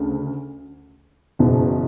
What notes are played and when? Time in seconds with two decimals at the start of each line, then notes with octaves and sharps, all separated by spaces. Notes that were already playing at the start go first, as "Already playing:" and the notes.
Already playing: D2 C#3
1.39 F#1 E2 B2